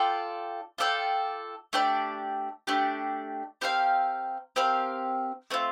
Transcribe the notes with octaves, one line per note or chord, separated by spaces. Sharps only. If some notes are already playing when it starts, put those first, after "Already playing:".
Already playing: F4 A4 D5 G5
F4 A4 D5 G5
A3 D4 G4 D5
A3 D4 G4 D5
C4 G4 A#4 F5
C4 G4 A#4 F5
A3 C4 F4